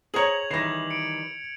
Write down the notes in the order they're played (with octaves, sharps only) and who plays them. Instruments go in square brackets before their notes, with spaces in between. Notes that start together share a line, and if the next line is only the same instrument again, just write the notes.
[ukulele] G#4 C#5 [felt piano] C5 A#5 C#7 [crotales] G#6 F7 F#7
[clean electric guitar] D#3 E3 G3 [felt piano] A#6 C7
[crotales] C#7 D7